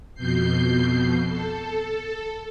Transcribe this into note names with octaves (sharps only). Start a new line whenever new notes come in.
F2 B2 G6 C7
A4